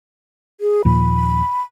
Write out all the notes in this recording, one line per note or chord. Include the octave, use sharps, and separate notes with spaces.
G#4
D#2 A#2 F3 B5